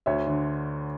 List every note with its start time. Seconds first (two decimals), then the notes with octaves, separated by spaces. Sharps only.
0.06 D2 C#5 E5
0.27 D3